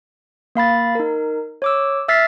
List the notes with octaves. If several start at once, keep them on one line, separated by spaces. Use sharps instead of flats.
A#3 F5 B5 A6
D#4 A#4
C#5 D6 E6
E5 E6 F6 A6 B6 C7